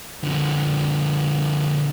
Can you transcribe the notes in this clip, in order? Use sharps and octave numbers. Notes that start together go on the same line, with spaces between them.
D3 F3